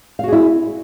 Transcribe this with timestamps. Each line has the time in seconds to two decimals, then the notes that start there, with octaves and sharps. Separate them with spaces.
0.19 F5
0.23 F#4
0.28 G#4
0.32 E4